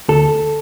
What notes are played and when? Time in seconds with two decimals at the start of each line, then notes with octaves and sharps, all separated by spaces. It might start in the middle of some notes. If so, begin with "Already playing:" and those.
0.09 D2 A4